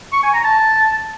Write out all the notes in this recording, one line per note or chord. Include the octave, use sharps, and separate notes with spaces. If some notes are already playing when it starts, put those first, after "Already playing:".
C#6
G#5
A#5
A5